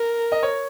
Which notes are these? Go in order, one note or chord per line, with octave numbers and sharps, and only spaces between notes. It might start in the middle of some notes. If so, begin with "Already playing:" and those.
Already playing: A#4
D#5
C#5